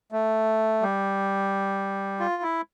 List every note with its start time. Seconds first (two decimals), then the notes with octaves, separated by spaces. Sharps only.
0.12 A3
0.82 G3
2.20 F4
2.43 E4